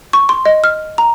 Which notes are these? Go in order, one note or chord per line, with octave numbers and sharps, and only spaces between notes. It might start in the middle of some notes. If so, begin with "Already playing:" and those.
C#6
C6
D#5
F6
A#5